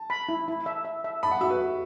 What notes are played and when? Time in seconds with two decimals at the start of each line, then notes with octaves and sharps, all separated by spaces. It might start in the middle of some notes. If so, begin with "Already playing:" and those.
Already playing: A5
0.10 B5
0.29 E4
0.48 E4
0.66 E5
0.85 E5
1.04 E5
1.23 A5 B5
1.31 F#5
1.41 F#4 E5
1.50 B4
1.61 F#4